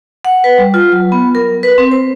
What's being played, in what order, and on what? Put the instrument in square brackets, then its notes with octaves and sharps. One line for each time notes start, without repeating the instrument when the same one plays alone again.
[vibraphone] F#5
B4
G3
F4
F#3
B3
A#4
B4
C4
C5